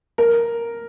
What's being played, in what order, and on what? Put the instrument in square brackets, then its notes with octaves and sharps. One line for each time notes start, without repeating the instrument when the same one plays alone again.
[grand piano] A#4